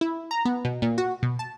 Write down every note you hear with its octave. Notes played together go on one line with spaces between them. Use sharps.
E4
A#5
B3
B2
A#2
F#4
B2
A5